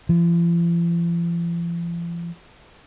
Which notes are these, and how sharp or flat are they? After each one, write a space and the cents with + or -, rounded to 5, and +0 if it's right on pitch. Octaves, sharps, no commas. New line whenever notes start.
F3 -45